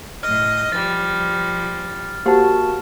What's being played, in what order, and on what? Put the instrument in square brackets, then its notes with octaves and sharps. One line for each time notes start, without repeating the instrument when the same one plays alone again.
[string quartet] A2 D#5 [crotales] F6
[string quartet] F3 G3 [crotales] A6
[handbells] A#3 F#4 A5 [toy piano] G4 C5 F#5